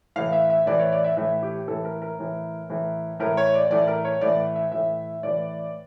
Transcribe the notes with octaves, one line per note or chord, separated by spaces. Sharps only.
A2 E3 F5
E5
E5
A2 E3 D5
C#5
D5
E5
A2 E3 E5
G4
A2 E3 A4
A#4
A#4
A2 E3
A2 E3
A2 E3 A#4
C#5
D5
A2 E3 D5
A#4
C#5
A2 E3 D5
E5
A2 E3 E5
A2 E3 D5